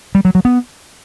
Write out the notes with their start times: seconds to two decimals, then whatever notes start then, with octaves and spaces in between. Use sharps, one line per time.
0.15 G3
0.25 F#3
0.35 F#3
0.45 B3